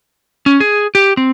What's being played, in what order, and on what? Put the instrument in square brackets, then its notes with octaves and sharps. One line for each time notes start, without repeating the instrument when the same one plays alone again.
[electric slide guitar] C#4
G#4
G4
C4